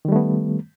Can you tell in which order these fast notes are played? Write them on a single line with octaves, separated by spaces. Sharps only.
D#3 G3 A3 B3